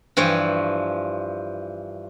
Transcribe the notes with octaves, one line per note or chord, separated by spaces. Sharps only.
G2 E3 F3 C#5 G5